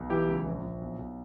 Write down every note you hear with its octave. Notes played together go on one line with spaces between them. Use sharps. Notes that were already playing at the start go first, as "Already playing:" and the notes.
Already playing: B1
E3 E4 G4
C#2
A#1
A#1
B1
B1